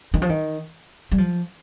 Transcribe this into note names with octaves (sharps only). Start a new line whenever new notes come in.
D#3
F3
D#3
G3
F3